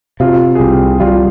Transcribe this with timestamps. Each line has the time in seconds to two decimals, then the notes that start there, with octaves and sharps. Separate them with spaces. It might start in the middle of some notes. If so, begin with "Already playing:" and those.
0.20 C3 F4
0.55 G#4
0.60 C2 G4
1.00 G3 F4